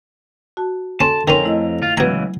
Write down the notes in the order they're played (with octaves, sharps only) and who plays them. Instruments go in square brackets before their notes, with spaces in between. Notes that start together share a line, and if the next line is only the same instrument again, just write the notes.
[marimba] F#4 A5
[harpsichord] C#4 [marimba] A4 C6 [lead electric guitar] A5
[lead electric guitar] F2 A#5 [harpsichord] D#3 C#4 [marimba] C#5 G#5 C6
[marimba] A3 E4 D#5
[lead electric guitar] F4
[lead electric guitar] C#2 E3 [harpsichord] B2 A#5 [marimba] F#3 G#6